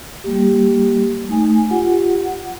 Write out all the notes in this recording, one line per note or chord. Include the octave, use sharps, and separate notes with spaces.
G3 A#3 G4
A3 D#4 G#5
F4 G4 F#5
F#5